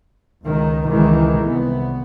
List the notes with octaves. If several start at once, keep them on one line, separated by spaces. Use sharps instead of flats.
C#2 D#3
C#2 D#3 E3 G#3
C2 B3